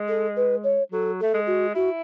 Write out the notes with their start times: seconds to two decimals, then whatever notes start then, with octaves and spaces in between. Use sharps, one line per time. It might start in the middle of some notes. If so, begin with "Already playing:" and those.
Already playing: G#3
0.08 A4
0.36 B4
0.64 C#5
0.92 F#3 A4
1.20 A3 A4
1.34 G#3
1.47 F#4
1.75 E4 F#4